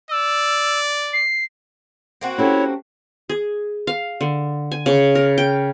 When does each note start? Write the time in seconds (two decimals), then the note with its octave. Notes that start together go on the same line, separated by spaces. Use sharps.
0.11 D5 E6
1.13 C7
2.21 A#3 C4 F#4
2.38 C#4 E4 G4 A4 C#5
3.29 G#4
3.87 F5
4.21 D3
4.71 G#5
4.86 C#3
5.15 A#4
5.38 G5